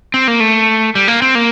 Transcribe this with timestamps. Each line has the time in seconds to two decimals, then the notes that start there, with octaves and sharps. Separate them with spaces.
0.14 C4
0.28 A#3
0.40 A3
0.95 G3
1.08 A#3
1.22 C4
1.35 A#3